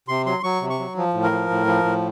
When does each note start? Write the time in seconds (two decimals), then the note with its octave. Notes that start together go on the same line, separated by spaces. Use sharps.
0.08 C3 C6
0.26 F#3 C6
0.43 F#3 C#6
0.62 C3
0.70 C#6
0.79 F#3
0.97 F3
1.14 A2
1.23 A#4
1.31 F3
1.50 A2
1.66 F3
1.84 A2